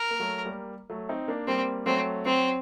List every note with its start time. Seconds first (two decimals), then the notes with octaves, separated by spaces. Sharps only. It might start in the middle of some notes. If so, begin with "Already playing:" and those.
Already playing: A#4
0.11 A#3
0.20 F#3 A3
0.45 G3 A#3
0.90 F#3 A3
1.09 C4 D#4
1.28 A#3 D4
1.47 G3 A#3 C4
1.86 F#3 A3 C4
2.25 F#3 C4